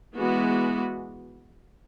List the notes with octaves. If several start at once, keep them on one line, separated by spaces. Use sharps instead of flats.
E3 G#3 B3 F#4